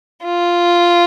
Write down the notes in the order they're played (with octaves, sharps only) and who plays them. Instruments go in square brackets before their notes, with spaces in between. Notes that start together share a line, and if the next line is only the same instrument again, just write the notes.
[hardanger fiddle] F4